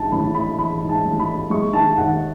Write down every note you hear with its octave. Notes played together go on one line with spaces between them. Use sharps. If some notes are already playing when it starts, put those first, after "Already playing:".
Already playing: G#2 E3 A5
A1 B5
A3 B5
E3 B5
G#2
A5
A1
B5
A3
G#3 C#6
D#3 A5
D#2 F#5